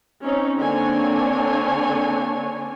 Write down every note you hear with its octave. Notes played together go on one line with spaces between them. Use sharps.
C4 C#4 D#4
D3 A#3 C4 D4 C#5 G#5